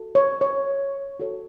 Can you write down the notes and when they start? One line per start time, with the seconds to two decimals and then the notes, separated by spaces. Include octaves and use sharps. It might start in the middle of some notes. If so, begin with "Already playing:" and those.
Already playing: F#4 A4
0.15 C#5
0.41 C#5
1.20 F#4 A4 C#5